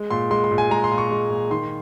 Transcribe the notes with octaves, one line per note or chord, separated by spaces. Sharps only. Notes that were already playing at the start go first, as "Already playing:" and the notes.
Already playing: G#3
A#2 C6
G#3 C6
C6
A#2
G#5
G#3 A#5
C6
A#2
C#6
G#3
A#2
D#3 C6